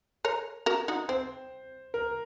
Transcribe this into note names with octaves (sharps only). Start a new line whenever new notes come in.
A#4 C#5
F#4 A#4
D#4 F#4
C4 C5
A#4